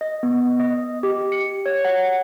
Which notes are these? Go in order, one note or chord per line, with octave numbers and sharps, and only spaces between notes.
D#5
B3
D#5
G4
C#7
C#5
F#5